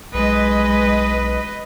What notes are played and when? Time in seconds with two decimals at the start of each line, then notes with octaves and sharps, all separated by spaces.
0.14 B1 G#3 B4 D#5